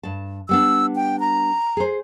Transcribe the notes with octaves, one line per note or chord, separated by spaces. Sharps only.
G2 A5
G3 B3 D4 E6
G5
A#5
G#4 C5